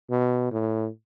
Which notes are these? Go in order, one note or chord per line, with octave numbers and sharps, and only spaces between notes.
B2
A2